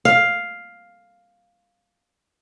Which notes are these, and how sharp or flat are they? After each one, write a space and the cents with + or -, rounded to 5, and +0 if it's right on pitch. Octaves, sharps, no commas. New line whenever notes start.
F5 +5